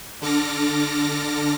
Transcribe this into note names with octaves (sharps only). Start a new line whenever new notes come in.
D3 A4 D6 F6 A#6